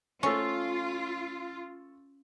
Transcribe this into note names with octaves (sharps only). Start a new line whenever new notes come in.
A3 C#4 F4 C#6